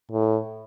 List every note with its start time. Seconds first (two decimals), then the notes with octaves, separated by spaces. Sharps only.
0.11 A2